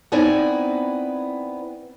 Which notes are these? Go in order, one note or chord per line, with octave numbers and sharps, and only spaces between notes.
B3 C4 D#4 E4 D5 G#5